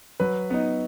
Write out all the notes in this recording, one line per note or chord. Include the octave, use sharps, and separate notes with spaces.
F#3 B4
B3 D#4